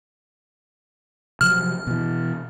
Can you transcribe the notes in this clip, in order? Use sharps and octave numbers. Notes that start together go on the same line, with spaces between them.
C3 F3 F#3 F6
B2 E3